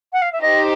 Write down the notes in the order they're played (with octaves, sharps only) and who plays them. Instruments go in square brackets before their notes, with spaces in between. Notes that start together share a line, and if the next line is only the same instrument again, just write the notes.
[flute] F#5
F5
E5
[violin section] D#4 G4 C5 [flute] D#5